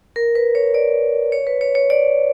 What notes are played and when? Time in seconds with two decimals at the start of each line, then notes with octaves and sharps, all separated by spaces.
0.16 A#4
0.35 B4
0.55 C#5
0.74 D5
1.32 C#5
1.47 B4
1.61 C#5
1.75 C#5
1.90 D5